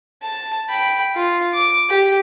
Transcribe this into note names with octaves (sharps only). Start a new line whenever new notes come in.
A5
G5 B5
F4
D6
G4